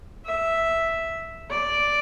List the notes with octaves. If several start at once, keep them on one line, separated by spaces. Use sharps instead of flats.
E5
D5